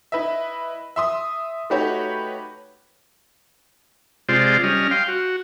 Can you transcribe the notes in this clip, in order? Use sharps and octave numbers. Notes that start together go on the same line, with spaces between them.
E4 B4 D#5 E5
E5 C6 D#6
A3 D#4 F#4 G4 B4 C#5
C3 G#3 F4 C5 D5
G3 C#4 D#5 F6
F5 G5 C6
F#4